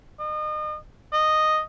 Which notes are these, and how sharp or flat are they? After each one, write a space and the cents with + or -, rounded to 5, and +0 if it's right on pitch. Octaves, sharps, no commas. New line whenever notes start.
D#5 -35
D#5 -5